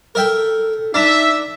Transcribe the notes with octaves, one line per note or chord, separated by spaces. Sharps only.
A4 A#4 E5 G5
D4 D#4 E5 A#5